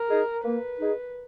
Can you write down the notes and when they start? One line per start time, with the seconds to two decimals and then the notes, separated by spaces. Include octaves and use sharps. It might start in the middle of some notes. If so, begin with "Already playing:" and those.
Already playing: A#4
0.08 D#4 G#4
0.44 A#3 B4
0.80 D#4 G#4